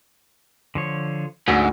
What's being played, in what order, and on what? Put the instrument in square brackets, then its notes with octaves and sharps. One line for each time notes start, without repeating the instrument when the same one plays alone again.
[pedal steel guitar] D3 F3 C#5
[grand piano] D2 [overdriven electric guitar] G#2 [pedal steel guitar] D3 C#4 E5